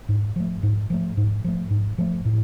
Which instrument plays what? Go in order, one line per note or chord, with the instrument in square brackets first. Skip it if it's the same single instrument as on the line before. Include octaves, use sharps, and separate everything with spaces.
[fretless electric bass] G#2
F3 A3
G#2
F3 A3
G#2
F3 A3
G#2
F3 A3
A2